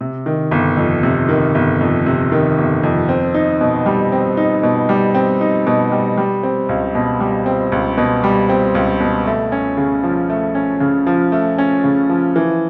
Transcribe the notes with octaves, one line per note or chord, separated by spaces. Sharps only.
C3
D#3
G1
F2
C3
D#3
G1
F2
C3
D#3
G1
F2
C4
D#4
B2
G3
C4
D#4
B2
G3
C4
D#4
B2
G3
G3
C4
C#2
B2
G3
C4
C#2
B2
G3
C4
C#2
B2
A3
C#4
C#3
F3
A3
C#4
C#3
F3
A3
C#4
C#3
F3
E3